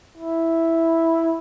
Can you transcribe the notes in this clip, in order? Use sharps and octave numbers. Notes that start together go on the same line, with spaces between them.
E4